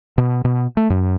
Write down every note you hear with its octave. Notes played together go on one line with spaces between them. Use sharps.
B2
B2
A3
F#2